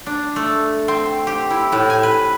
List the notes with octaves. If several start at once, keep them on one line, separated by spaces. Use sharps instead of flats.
D4
A3
C4
G4
E4
A2
G#5
B4